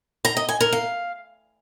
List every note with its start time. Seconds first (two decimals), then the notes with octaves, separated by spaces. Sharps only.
0.25 A#5
0.37 D#5
0.49 G#5
0.61 A#4
0.73 F5